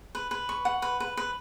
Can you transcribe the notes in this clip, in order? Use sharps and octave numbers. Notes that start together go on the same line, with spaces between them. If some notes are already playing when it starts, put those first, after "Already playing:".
B4
B4
C#6
F#5
B4
B4
B4